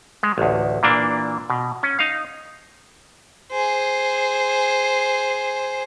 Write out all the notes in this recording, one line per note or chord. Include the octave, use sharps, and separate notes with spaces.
G#3
A1 D2
A#2 E3 A#3 D4
B2
C#4
D#4 F5
G#4 C5